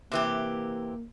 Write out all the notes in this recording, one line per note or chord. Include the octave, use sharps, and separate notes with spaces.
C3 E3 A#3 G4